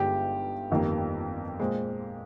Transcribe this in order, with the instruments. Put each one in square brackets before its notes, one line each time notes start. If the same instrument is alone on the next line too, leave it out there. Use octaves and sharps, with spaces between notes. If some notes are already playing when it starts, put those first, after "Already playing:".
Already playing: [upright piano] G1 G2 D3 G#3 D#4 [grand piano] G4
[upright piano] G1 F2 D#3 G3 A#3
A#2 G#3 C4